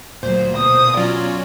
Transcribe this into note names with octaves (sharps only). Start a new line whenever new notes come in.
D2 A#2 F#3 C5
B2 D#6
F#3 C#4 F4 D5